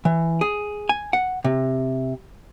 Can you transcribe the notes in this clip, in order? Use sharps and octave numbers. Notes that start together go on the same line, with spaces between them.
E3
G#4
G#5
F#5
C3